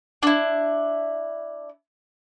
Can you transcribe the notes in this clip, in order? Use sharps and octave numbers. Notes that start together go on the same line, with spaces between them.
D4 E4